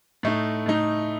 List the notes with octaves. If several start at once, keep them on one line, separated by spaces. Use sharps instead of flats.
A2 A3 D#4
A2 A3 D#4